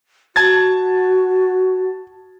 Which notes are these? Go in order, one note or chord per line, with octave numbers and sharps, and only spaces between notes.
F#4 A5 G#6 A6